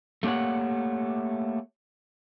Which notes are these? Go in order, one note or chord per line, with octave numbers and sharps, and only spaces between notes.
A3 A#3 G4 C#5 F#5